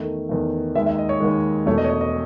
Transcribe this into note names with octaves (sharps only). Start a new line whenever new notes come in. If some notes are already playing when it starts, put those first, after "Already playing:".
Already playing: E2 D#3 A3
E2 D#3 A3
D#2 D#3 G#3 E5
E5
D#5
C#5
D#2 D#3 G#3
E1 E2 B2 A3 C#5
D#5
C#5
D#5
D#5